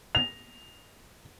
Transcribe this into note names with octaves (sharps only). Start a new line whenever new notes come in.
F7